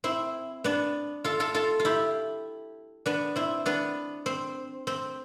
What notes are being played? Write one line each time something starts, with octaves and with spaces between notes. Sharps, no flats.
C4 E4
B3 D4
F4 A4
F4 A4
F4 A4
F4
E4 G4
B3 D4
C4 E4
B3 D4
C4
C4